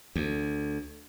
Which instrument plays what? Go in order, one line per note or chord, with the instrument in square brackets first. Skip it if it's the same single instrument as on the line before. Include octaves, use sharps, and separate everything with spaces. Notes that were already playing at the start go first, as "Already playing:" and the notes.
[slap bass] D2